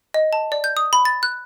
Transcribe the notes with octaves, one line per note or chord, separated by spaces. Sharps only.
D#5
A5
D5
G6
D#6
B5
A6
F#6